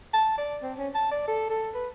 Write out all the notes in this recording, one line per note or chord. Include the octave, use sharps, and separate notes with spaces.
A5
D5
C4
C#4
A5
D5
A4
A4
B4